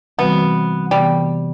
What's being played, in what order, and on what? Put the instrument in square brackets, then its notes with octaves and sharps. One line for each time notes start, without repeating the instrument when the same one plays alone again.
[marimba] C3 E3 G3 C4 F#4 [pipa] B3
[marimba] C3 E3 B3 [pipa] G3